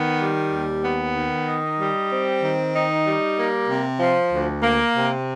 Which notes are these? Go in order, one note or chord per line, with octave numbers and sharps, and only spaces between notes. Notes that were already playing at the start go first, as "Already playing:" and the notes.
Already playing: D#3 B3
G3
D#2
B3
D#3
D#4
G3
C4
D#3
D#4
G3
A#3
C3
F3
D2
A#3
C3